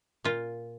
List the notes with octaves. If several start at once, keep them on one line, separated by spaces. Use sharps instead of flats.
A#2 F4